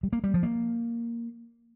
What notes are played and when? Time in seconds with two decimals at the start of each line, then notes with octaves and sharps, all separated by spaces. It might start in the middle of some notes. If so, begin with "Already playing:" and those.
0.03 G3
0.13 A#3
0.24 G3
0.34 F3
0.43 A#3